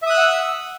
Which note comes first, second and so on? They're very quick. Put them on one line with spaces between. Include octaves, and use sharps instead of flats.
E5 D#6 F#6 E6 F#5